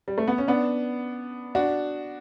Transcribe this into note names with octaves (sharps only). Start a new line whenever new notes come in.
G3
A3
B3
C#4
B3 D4
D4 F#4